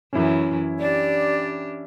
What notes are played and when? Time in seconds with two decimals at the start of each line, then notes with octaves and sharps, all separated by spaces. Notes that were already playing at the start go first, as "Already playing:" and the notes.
0.13 F#2 E3 C#4 E4
0.80 D4 G4 D5